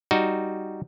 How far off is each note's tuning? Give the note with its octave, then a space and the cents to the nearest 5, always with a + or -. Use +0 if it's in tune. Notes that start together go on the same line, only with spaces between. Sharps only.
G3 +0 D#4 +0 F#4 +0